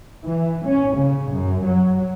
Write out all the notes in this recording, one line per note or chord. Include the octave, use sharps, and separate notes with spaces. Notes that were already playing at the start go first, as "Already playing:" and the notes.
E3
C#4
C#3
F#2
F#3